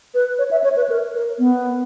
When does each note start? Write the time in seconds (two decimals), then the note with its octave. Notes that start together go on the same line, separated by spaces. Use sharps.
0.14 B4
0.39 C#5
0.51 E5
0.64 C#5
0.77 B4
0.90 A#4
1.15 A#4
1.39 B3